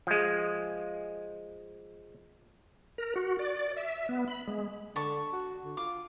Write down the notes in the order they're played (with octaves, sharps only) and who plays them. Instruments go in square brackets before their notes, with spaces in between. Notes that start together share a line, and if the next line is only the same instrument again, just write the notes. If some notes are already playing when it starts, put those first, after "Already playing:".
[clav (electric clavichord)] F3 G#3
[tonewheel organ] A#4
F#4
D5
E5
B3
B5
G#3
[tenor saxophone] D3 [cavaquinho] A5 C#6
[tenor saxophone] F#4
D3
[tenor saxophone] F4 [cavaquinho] D6